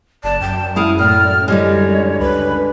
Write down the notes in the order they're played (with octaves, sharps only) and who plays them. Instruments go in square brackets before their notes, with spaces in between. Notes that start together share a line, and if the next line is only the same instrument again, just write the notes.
[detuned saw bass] F#1 [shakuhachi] D5 [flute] A5
[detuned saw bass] F#2 [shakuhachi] G5
[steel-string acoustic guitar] G#3 E4 F5 [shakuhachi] B5 [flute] D#6
[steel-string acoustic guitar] A2 [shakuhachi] D5 [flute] F6
[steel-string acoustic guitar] D3 G3 G#3 [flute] C#5 [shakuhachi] D#5
[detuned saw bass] C#2 [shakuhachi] B4 [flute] B5